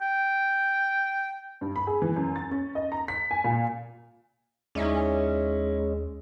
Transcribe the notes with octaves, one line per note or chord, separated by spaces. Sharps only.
G5
G2
B5
G#4
E3
F#2
A6
C#4
D#5
A#5
B6
G#5
A#2
D#2 G#3 C#4 D#4 E4 D5